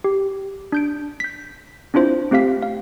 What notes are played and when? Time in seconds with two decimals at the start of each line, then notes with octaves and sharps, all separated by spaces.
0.04 G4
0.72 D4 G6 D7
1.20 G6 B6
1.94 C4 D4 E4 F4 C5
2.31 A3 C4 G4 F5 B6
2.62 F5